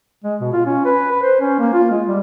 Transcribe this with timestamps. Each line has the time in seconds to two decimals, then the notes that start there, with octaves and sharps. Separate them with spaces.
0.24 G#3
0.41 B2
0.53 F4
0.66 C#4
0.85 B4
1.11 B4
1.23 C5
1.41 C#4
1.59 A#3
1.74 F4
1.90 G#3
2.07 G3